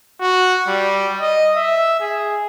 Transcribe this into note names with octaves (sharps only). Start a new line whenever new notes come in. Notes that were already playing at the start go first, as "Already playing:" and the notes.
F#4
G3
D#5
E5
G#4